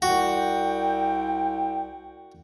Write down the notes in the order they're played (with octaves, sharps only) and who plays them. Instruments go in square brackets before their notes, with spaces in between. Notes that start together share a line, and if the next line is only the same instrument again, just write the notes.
[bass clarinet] C2 [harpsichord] F#4 [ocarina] G5